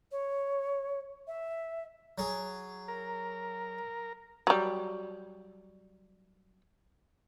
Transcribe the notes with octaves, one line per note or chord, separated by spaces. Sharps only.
C#5
E5
F#3 G#4
A#4
F#3 G3